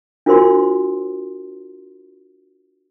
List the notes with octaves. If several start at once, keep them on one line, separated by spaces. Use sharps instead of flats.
D4 F4 F#4 A#4 C5 C6